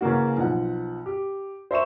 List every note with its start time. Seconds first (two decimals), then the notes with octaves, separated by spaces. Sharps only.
0.01 C#3 E3 A#3 F#4
0.37 B1 F3 F#5
1.06 G4
1.71 C5 E5 C#6 E7